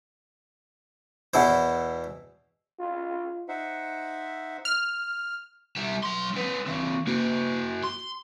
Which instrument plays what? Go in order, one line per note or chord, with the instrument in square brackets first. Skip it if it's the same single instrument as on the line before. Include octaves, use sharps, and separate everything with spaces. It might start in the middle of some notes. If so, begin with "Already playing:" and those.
[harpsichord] E2 B2 E4 C5
[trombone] F4
[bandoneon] D#4 C5 E5 F#5
[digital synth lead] F6
[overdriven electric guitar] G3 E5
F#3 C6
C4 B4
E3 C4
A#3 F#4
C6